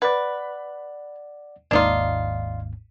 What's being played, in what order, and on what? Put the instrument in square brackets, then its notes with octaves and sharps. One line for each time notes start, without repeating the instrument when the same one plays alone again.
[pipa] B4 [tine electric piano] D5 F#5
[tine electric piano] G#1 D#2 G#2 [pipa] D4 D#4 F4